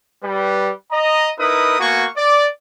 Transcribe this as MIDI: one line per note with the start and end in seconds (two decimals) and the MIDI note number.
0.23 0.70 55
0.23 0.70 71
0.91 1.29 75
0.91 1.29 82
1.39 1.76 63
1.39 1.76 64
1.39 1.76 70
1.39 1.76 71
1.39 1.76 87
1.79 2.06 58
1.79 2.06 59
1.79 2.06 66
1.79 2.06 80
1.79 2.06 85
2.16 2.46 74